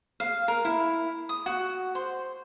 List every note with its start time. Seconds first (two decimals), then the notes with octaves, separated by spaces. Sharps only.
0.20 F5
0.48 A#4
0.65 E4
1.29 D#6
1.46 F#4
1.95 C5